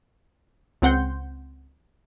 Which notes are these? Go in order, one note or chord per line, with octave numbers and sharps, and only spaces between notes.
C#2 C4 F#5 C6 G6